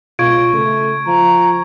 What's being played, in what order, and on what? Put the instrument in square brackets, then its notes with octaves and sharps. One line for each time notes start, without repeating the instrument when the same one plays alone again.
[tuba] C#2 [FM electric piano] B2 F4 [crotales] C#6 G#6 D7
[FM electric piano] C#3 [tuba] A3
[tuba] F3 [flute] A#5